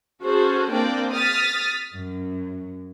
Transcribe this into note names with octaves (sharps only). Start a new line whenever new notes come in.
C#4 F#4 G#4 A4 C5
A#3 C4 D4 A#4 D5 G5
D#6 F6 A6 B6
F#2